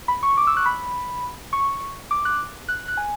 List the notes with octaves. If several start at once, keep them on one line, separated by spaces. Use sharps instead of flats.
B5
C#6
D6
E6
F#6
B5
C#6
D6
F#6
F#6
F#6
G#5